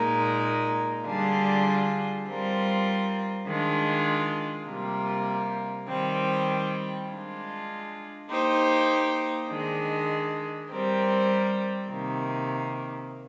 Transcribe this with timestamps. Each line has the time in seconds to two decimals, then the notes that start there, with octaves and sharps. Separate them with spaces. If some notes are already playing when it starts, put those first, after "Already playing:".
Already playing: A#2 G#3 D#4 A#4
1.06 D3 G3 D4 F4 G#4
2.27 G3 C4 F4 A#4
3.47 D#3 G#3 D4 F4
4.67 C3 G3 A#3 F4
5.88 D#3 G3 C4
7.08 G#3 D4 F4
8.29 A#3 D#4 G4 C5
9.50 D#3 G#3 D4
10.70 G3 C4 G4 A#4
11.90 C3 D#3 A#3